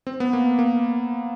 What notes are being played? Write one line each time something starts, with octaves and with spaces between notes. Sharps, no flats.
C4
B3
A#3
A#3